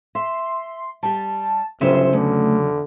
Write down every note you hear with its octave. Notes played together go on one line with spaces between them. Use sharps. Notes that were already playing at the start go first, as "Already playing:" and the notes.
E5 C6
G3 G4 A5
G1 C#3 F#3 C#4 C5 E5 C6
E2 D3 A3